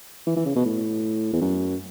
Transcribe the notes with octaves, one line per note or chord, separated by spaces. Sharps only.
E3
E3
C#3
B2
A2
E2
F#2